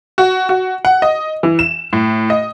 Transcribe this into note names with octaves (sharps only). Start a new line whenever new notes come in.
F#4
F#4
F#5
D#5
E3
E7
A2
D#5